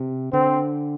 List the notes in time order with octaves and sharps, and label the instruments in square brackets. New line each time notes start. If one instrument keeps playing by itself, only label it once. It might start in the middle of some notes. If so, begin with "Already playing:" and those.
Already playing: [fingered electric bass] C3
[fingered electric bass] D3 [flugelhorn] C4